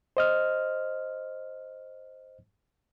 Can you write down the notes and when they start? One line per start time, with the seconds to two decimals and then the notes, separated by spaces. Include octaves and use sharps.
0.17 C5 D#5 F6